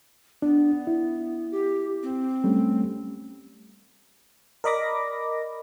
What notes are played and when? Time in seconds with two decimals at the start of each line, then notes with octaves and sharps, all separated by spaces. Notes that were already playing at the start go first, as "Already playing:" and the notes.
0.42 B3 D4
0.87 E4
1.52 G4
2.03 C4
2.44 G3 A3 C#4
4.64 A#4 D5 D#5 B5 D6 A#6